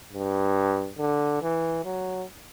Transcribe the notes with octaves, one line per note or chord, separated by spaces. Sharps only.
G2
D3
E3
F#3